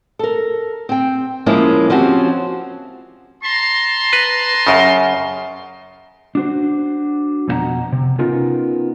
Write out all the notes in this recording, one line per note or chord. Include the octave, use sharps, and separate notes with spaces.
A4 A#4
C4 G5
F3 G#3 A#3 C#4 E4 F4
F3 C4 C#4 F#4 G4
A5 A#5 C6
B4
F#2 C#3
D4 F#4 C5
F2 B2 D#4 E4 F#5 A#5
C3
B3 C#4 D#4 F4 A#4